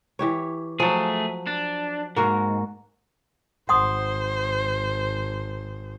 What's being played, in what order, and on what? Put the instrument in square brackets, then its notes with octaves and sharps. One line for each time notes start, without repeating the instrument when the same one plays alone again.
[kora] E3 G4 C#5
[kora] F3 F#3 [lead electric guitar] A3 G#4
[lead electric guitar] D4
[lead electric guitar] G#2 [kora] A#3 F#4 A#4
[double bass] G#1 [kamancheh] C5 [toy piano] F#5 C6 D#6